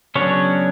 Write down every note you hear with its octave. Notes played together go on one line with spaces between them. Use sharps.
C#3 F#3 B3 C#4 D4 C#5